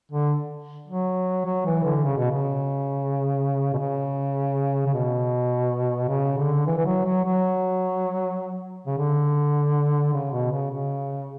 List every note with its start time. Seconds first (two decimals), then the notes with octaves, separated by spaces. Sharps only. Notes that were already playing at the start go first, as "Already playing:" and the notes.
0.12 D3
0.88 F#3
1.46 F#3
1.66 E3
1.85 D3
2.04 C#3
2.17 B2
2.31 C#3
3.74 B2
3.78 C#3
4.87 C#3
4.94 B2
6.09 C#3
6.38 D3
6.67 E3
6.78 E3
6.86 F#3
7.05 F#3
7.24 F#3
8.87 C#3
8.98 D3
10.13 C#3
10.33 B2
10.52 C#3
10.71 C#3